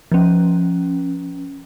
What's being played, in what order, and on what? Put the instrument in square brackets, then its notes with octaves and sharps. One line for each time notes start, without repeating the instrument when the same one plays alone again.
[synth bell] F3 C#4